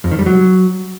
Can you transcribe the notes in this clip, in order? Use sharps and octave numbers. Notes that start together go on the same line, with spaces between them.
F2
D#3
G3
F#3